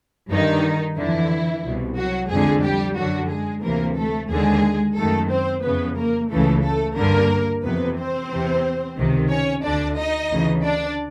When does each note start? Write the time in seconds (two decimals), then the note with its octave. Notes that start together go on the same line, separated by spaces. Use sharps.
0.30 G2 D3 D#3 D#4
0.97 F2 D3 E3 E4
1.65 C2 B2
1.97 F#3 F#4
2.30 F2 D3 G#3 G#4
2.64 G3 G4
2.97 F#2 D3 F#3 F#4
3.31 G#3 G#4
3.64 D2 C3 E3 A#3 A#4
3.97 A3 A4
4.31 D#2 D3 G#3 G#4
4.97 F#2 D#3 A3 A4
5.31 C4 C5
5.64 F2 C#3 E3 B3 B4
5.97 A#3 A#4
6.30 C#2 C#3 E3 A3 A4
6.64 A3 A4
6.97 G2 D3 A#3 A#4
7.63 F2 C3 E3 B3 B4
7.98 C4 C5
8.30 E2 C3 E3
8.97 C#2 C3 D#3
9.30 C#4 C#5
9.64 D2 D3 D4 D5
9.98 D#4 D#5
10.31 D2 C#3 E3
10.64 D4 D5